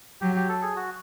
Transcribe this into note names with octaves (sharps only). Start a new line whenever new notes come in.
F#3 G4
G4
A4
G#4
F#4